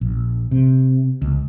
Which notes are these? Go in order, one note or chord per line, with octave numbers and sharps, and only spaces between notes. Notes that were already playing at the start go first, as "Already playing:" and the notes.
A#1
C3
C#2